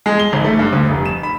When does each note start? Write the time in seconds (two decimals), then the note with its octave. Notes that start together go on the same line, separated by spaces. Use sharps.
0.06 G#3
0.20 G7
0.33 G#1
0.45 A3
0.59 G2
0.72 D2
0.88 F1
1.05 E7
1.23 B5